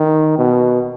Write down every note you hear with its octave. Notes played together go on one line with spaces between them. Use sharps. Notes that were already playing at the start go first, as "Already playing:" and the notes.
Already playing: D#3
B2